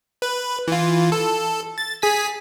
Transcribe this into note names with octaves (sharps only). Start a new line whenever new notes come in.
B4
E3 F4
A4
A6
G#4 G#5 B6